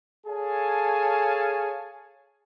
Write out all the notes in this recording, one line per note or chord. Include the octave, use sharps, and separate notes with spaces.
G#4 A4 C#5 F5 G#5 A5